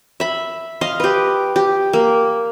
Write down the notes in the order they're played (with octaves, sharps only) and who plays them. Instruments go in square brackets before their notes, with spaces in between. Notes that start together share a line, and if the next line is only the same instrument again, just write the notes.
[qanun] E5 B5
D#5 F5 C6
G4 B4
G4
A#3